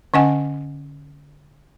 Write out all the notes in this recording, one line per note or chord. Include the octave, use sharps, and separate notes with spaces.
D3 C#4 D#5 F#5 G#5